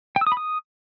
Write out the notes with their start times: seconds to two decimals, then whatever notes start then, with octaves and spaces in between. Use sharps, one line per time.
0.16 G5
0.21 E6
0.27 D#6
0.32 B5
0.37 D#6